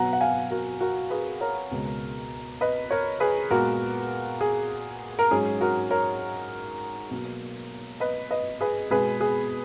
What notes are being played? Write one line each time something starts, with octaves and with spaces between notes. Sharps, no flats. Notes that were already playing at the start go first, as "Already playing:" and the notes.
Already playing: B2 F#3 B3 F#5 A#5
F#5
F5 G#5
F#4 A#4
F#4 A#4
G#4 B4
A#4 C#5
C#2 B2 G#3
B4 D#5
A#4 C#5
G#4 B4
A#2 G#3 B3 F#4 A#4
G#4
A#4
G#2 F#3 C#4 G#4
F#4 A#4
A#4 C#5
B2 F#3 A#3
B4 D#5
B4 D#5
G#4 B4
B2 G#3 B3 G#4 B4
G#4